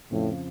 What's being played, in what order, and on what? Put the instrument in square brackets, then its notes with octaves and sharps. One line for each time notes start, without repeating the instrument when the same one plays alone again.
[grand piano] F2 C#3 F3 [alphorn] A2